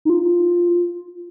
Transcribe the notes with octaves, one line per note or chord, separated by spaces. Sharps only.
D#4
F4